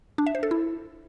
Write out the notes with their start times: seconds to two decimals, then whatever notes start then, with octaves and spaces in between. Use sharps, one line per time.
0.18 D4
0.26 E5
0.35 C5
0.43 A4
0.51 E4